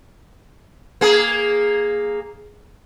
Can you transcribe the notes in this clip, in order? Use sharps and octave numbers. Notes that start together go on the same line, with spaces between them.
A#3 G#4